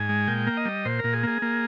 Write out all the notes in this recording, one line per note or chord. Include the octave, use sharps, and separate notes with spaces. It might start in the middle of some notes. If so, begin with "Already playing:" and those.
Already playing: G#2 G#5
G#3
A#2 G5
A#3
D#5
G3
A#2 C5
A#2 A#4
G#4
A#3 G#4
A#3